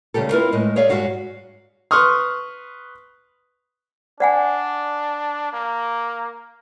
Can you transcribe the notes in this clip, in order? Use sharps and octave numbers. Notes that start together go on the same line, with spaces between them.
D2 C#3 G3 G4 A4
C4 E4 F4 A#4 B4
A2 G#3 D#5
G#4 C#5 D5 E5 F5
G#2 G3 F#4 F5 F#5
B4 C6 C#6 D#6 F6
D4 D5 F#5 G#5
A#3